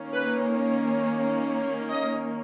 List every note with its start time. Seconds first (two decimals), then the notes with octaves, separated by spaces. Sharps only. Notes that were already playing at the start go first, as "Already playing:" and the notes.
Already playing: D#3 A#3 C#4
0.14 B4
1.90 D#5